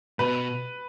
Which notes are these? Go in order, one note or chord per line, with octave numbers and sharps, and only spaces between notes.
B2 B4